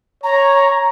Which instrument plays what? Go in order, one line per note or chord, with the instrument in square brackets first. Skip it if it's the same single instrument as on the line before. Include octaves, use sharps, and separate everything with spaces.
[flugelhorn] C#5 [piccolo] A#5